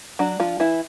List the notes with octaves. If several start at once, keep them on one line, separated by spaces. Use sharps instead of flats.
F#3 D4 F#4
F3 F4
E3 E4